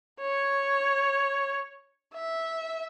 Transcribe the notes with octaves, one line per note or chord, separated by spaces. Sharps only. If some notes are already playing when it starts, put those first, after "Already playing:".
C#5
E5